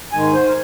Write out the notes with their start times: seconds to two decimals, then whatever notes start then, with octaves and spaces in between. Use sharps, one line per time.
0.13 G#2 D#3 G#3 G#5
0.34 C5
0.48 A#4